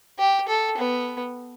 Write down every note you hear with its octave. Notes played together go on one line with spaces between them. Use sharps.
G4
A4
B3